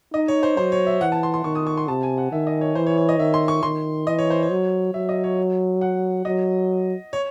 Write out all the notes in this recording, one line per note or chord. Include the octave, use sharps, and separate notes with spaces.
D#4 D#5
C#5
C5
F#3 C5
C#5
E5
E3 F#5
A5
C6
C6
D#3 C#6
D#6
C#6
C6
C3 A5
G#5
F#5
D#3 E5
D#5
C#5
E3 C5
C#5
C#5
D#5
D#3 E5
C6
C#6
D#3 C6
E3 D#5
C#5
C5
C#5
F#3
F#3 E5
D#5
C#5
F#5
F#3 D#5
C#5